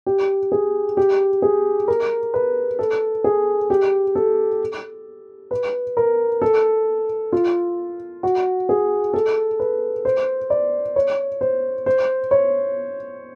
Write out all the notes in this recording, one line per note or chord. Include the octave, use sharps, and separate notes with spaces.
G4
G#4
G4
G#4
A#4
B4
A4
G#4
G4
A4
B4
A#4
A4
F4
F#4
G#4
A4
B4
C5
D5
C#5
C5
C5
C#5